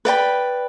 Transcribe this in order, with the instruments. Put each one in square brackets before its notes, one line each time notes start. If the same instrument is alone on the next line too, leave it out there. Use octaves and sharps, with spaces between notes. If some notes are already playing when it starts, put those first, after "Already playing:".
[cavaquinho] B4 D5 G5 B5